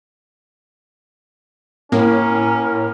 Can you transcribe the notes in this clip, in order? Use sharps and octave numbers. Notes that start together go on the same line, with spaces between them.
A2 A#3 C#4 A#4